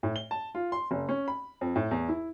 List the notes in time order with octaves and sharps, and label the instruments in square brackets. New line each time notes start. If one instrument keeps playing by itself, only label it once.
[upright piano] A2
G7
A5
F4
C6
F#1
C#4
B5
F2
A2
E2
E4